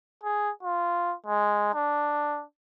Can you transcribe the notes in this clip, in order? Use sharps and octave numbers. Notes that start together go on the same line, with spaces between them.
G#4
F4
G#3
D4